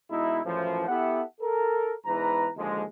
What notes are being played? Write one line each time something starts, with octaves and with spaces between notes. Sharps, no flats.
B2 G#3 D#4 E4
F#2 A2 E3 F3
B3 E4 G4 A4 E5 F#5
A4 A#4
E2 G#2 E3 B4 A#5
D#2 D3 F3 G#3